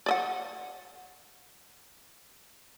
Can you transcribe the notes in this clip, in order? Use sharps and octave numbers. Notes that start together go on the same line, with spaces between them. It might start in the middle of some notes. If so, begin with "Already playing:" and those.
D5 D#5 F#5